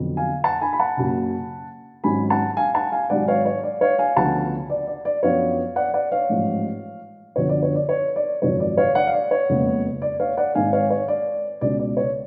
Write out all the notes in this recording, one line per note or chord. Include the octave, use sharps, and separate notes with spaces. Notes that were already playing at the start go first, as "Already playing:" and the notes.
Already playing: F2 D3 F#3 B3
F5 G#5
F#5 A5
G#5 B5
B5
F#5 A5
F#1 F#2 C#3
G#1 G#2 F#3 C#4 G#5 B5
F#5 A5
F5 G#5
F#5 A5
F5 G#5
G#1 G#2 F#3 D5 F#5
C#5 F5
C#5
D5
C#5 F5
F5 G#5
D2 C#3 F3 B3 F#5 A5
D5
D5
D5
F#2 F3 B3 D4 C#5 F5
D5 F#5
D5 F#5
C#5 F5
A1 G#2 F3
F#2 D3 F3 B3 D4 C#5
D5
C#5
D5
C#5
D5
G#1 F#2 C#3 F3 C#5
D5
C#5 F5
D5 F#5
F5
D5
C#5
F#1 F2 C#3 G#3 B3
D5
C#5 F5
D5 F#5
G#1 G#2 G#3 F5 G#5
C#5 F5
C#5
D5
C#2 B2 G#3 C#4 D5
D5
C#5